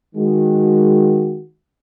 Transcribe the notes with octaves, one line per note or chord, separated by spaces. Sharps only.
D#3 G#3 F#4